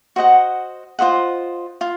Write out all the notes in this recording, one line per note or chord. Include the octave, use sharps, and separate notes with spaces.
F#4 C5 D#5 F#5
F4 C5 D#5 F#5
F4